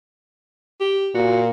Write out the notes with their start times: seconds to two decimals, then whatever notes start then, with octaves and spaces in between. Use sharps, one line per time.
0.80 G4
1.15 A#2 F#4